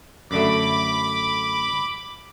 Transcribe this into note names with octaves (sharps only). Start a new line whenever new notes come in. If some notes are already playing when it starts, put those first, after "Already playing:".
F#2 D3 A3 B5 D6